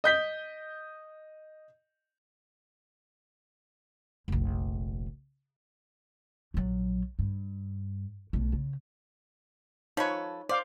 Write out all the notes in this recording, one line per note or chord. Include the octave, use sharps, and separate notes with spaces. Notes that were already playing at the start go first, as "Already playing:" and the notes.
D#5 G6 B6 G7
F1 A#1
A#1 F#3
G2
B1 A3
C#3
F3 D#4 A4 B4 C#5 C#6
C5 D5 F5 D6